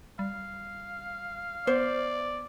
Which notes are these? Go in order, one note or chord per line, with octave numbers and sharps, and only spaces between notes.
G3 F5
B3 C5 D5